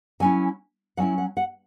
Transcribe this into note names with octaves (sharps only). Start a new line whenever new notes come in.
F#3 C#4 E4 G#5
F#3 C#4 E4 F#5
F#5
F#5